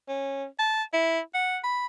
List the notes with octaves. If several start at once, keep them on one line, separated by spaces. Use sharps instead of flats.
C#4
A5
E4
F#5
B5